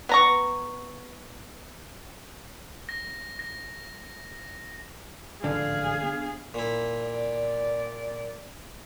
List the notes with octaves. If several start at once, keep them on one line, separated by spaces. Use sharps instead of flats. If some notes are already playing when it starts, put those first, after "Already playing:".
B3 A#5 C#6
A#6
A#6
A1 G#2 D3 F3 G#4 F5
B3 D4
A#2 E4
D5